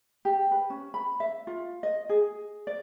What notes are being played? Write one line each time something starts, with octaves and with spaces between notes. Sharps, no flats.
G4
B4
C#4
B5
E5
F4
D#5
G#4
D5